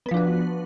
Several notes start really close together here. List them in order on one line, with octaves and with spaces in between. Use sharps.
B3 B4 F3 D4 F#4